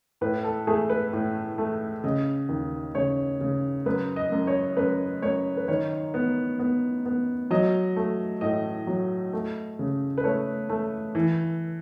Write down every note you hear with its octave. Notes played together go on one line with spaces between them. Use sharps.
A2 B4
A4
A3 G#4
B4
A2
A3
C#3 D#5
D#2
C#3 C#5
C#3
F#2 B4
D#5
F#2
C#5
F#2 B4
F#2 C#5
B4
D#3 C#5
B3
B3
B3
F#3 D#5
A3
A2 D#5
F#3
A3
C#3
B4
A3 C#5
A3
E3